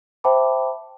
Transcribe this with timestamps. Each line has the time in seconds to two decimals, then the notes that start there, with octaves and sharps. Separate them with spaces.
0.24 C5 E5 G5 A5 B5 D6